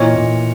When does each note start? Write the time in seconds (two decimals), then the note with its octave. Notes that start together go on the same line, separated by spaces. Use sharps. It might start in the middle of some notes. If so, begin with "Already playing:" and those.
Already playing: A#2 E3 C#5 D#5
0.15 A#2